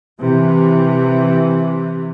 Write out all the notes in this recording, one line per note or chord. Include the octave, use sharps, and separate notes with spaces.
C3 E3